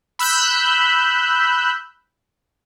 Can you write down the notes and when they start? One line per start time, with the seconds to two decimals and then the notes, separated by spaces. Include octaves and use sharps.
0.19 B5 E6 F#6 G6